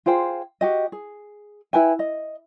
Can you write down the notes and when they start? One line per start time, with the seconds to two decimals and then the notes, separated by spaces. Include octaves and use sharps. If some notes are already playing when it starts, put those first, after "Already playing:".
0.06 F4 G#4 C5 G5
0.61 F#4 G4 D#5
0.92 G#4
1.73 E4 B4 G5 G#5
1.99 D#5